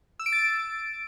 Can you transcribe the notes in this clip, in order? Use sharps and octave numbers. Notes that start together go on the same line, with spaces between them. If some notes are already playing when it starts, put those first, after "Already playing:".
E6
D7
A6